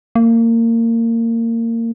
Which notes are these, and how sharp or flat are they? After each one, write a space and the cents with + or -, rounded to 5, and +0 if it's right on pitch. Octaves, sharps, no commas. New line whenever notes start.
A#3 -25